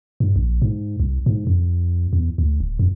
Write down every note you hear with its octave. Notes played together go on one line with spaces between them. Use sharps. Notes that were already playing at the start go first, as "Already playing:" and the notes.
G2
A#1
G#2
C2
G#2
F2
E2
D2
D1
F2